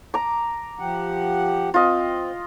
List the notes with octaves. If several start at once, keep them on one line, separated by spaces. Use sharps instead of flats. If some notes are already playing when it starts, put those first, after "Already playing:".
A#5 D6
F3 G4 F#5
C4 F4 D#5